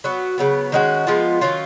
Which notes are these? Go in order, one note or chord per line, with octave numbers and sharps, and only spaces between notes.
F#3 B3 F#4
C#3 F#3 B3
D#3 G#3 C#4 F#4
F3 G#3 B3 F4
D#3 F#3 C#4 F4